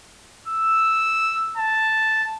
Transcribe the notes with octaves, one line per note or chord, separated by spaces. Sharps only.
E6
A5